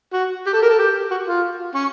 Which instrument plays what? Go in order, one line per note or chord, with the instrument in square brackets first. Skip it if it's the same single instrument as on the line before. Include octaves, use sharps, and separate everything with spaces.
[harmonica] F#4
G4
A4
A#4
A4
G4
F#4
F4
C#4